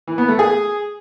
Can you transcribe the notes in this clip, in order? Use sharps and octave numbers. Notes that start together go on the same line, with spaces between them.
E3
B3
A3
G#4